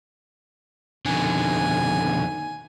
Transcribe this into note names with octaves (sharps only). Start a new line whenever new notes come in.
F2 B2 D3 D#3 G#5